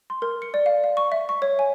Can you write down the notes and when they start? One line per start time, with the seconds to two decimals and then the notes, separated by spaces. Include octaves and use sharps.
0.10 C6
0.22 A#4
0.42 C#7
0.54 D5
0.66 F5
0.84 F5
0.97 C#6
1.12 E5
1.29 C#6
1.42 C#5
1.59 G#5